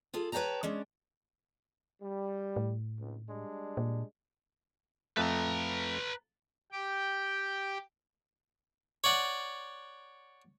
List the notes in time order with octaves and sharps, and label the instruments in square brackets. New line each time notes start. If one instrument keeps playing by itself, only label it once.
[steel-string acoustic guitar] F4 G#4 A4
B4 C#5 F5 G5 A5 A#5
G#3 C#4 D4
[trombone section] G3
[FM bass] A2
[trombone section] G#1 C#2
G3 G#3 D4
[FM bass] A#2
[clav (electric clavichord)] F2 A3 [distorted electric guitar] B4 A#5
[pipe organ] G4 G5
[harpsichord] C#5 D5 F#5